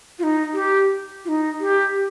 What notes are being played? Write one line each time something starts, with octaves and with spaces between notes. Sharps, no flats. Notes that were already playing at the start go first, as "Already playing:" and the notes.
F4
D#4
G4
F4
D#4
G4